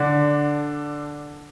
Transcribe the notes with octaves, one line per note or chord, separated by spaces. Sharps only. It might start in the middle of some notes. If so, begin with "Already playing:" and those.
Already playing: D3 D4